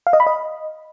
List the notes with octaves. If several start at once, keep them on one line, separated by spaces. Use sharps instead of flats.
F5
D#5
B5
D#5